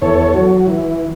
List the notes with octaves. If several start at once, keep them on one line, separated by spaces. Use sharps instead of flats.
E2 A4 C#5
F#3
E3